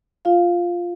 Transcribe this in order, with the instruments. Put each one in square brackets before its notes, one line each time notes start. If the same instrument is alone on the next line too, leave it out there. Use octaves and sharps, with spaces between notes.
[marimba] F4 F5